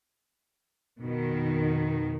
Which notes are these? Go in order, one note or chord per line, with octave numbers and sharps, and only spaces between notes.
F2 B2 D#3